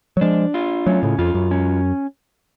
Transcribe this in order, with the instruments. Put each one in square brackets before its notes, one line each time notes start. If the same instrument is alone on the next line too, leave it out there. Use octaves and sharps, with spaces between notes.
[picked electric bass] F#3
[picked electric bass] F3 G#3 [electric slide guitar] D4
[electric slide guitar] F4
[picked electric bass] F#3 A3 [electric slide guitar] C#4
[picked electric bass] A2 C#3
[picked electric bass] F2 [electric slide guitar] F4
[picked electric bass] F#2
[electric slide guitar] C#4